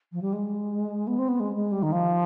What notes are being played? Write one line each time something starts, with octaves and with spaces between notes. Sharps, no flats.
F3
G3
G#3
B3
C4
B3
G#3
G#3
G3
D#3
F3